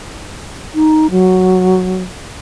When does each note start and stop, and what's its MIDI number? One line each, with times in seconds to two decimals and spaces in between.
0.74 1.10 63
1.11 2.04 54